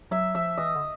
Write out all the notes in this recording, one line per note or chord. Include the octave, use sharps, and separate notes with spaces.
F#3 E5
F3 E5
E3 D#5
D3